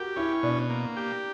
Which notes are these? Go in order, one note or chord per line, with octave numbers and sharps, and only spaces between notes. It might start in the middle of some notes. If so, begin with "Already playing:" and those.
Already playing: F#4 G4 A#4
C#4 E4
B2 D4
A#3
G4